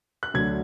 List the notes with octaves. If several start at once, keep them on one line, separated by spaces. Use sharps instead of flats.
F#6
D2 D3 F#3 A3 G#6